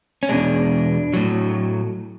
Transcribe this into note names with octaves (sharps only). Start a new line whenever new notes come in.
C#4
E2 B2 G#3 D4
A2 F#3